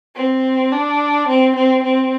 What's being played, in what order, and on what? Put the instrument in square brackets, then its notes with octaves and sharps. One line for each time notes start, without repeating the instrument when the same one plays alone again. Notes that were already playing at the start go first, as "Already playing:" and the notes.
[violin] C4
D4
C4
C4
C4